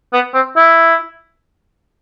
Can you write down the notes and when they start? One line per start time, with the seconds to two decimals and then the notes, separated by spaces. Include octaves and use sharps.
0.13 B3
0.34 C4
0.56 E4